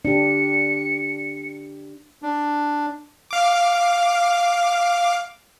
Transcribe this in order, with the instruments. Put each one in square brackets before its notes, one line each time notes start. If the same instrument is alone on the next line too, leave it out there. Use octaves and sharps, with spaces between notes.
[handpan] D4 G4 [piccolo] C#7
[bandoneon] D4
[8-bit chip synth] F5 D6